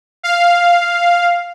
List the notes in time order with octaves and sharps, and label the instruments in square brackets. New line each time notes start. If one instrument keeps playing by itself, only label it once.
[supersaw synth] F5